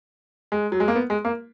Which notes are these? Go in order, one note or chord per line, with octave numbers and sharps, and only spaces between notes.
G#3
F#3
G#3
A#3
B3
G#3
A#3